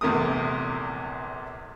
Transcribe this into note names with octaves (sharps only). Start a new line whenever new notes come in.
A#1 E2 C3 A3 A#4 D#6